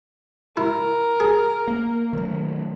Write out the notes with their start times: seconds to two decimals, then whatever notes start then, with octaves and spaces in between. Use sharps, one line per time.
0.57 E4 A#4
1.20 G#4
1.68 A#3
2.13 D#3 F#3 A3